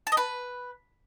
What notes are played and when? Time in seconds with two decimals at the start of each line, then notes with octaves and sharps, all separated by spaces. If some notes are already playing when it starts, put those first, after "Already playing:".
0.07 A5
0.12 D#5
0.17 B4